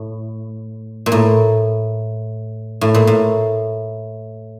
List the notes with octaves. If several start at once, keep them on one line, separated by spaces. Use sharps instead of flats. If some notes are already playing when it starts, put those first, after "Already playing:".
Already playing: A2
A#2
A2
A2
A#2
A2